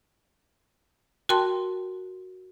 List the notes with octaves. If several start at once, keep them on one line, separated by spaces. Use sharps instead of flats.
F#4 A#4 G5 A5 C6